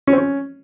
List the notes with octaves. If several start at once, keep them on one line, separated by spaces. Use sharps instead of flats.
C#4
C4
C#4